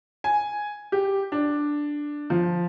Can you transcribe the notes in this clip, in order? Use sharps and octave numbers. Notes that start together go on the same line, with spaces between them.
G#5
G4
D4
F3